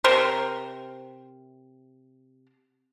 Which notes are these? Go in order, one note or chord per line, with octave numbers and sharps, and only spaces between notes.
C3 A#4 C5